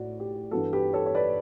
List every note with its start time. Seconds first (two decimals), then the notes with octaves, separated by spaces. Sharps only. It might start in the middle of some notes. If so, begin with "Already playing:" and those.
Already playing: A2 A3 F#4 D5
0.20 G4
0.51 G2 E3 B3 F#4 A4
0.73 G4 B4
0.93 A4 C#5
1.06 C#5
1.15 B4 D5